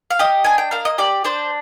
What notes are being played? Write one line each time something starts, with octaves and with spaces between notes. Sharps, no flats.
F5
G4 D#5
D4 G#5
G5
A#3 F5
D#5
G4 D5
D4 C5